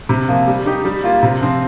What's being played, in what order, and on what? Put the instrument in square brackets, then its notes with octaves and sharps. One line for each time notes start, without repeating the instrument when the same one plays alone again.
[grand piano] C3
F3 A#3
G3
D#4 G4
G3
A#3 F4
C3
F3 C4